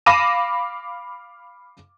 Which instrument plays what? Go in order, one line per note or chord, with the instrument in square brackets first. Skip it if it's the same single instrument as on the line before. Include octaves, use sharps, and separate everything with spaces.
[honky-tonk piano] F5 B5 D6 A#6 D#7 E7